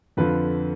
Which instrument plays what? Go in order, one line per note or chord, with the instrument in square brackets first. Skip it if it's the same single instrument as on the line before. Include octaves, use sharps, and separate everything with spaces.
[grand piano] F2 D3 F3 B4